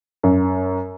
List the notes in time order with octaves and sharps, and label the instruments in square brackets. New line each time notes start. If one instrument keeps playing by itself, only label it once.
[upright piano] F#2